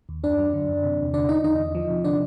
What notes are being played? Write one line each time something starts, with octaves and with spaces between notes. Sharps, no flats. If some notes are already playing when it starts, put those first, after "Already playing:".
D#2
F#2 D4 D5
F#3
D3
F#2
C3
E2
D3 D4 D5
D3 D#4 D#5
E2 D#4 D#5
E2
F3
C3
D3 D4 D5